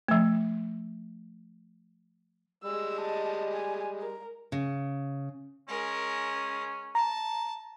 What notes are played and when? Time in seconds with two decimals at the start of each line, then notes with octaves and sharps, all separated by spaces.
0.08 F3 A3
2.64 G3 G#3 E6
3.01 D#5 A5
3.53 G#5
4.00 A#4
4.52 C#3
5.68 G#3 C#4 A#4
6.95 A5 A#5